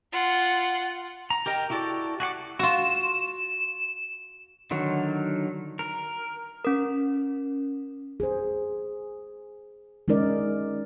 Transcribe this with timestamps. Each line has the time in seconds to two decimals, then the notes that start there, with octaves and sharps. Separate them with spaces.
0.12 F4 F#5
1.30 A#5
1.46 G4 A#4 D#5 G5
1.70 E4 F#4 G4 A4 D5
2.20 F#4 G#4 F#5 D6
2.59 F4 F#4 E7
4.71 D3 D#3 F#3
5.79 A#4
6.65 C#4 A#4
8.20 G#4 C5
10.08 G#3 C#4 D#4 A#4 D5